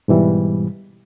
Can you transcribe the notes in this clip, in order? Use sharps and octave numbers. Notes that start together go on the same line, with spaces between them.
G#2 B2 E3 G3